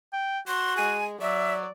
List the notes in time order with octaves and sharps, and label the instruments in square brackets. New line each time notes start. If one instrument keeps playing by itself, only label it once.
[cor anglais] G5
[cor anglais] F#4 [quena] C6
[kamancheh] G#3 [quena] G#5
[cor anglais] F#3 [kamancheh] D5 [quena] E5